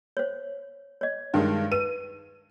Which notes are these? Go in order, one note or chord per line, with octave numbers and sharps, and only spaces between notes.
C5 C#5
C#5 D#5
G2 D#3 G#3
B4 D#7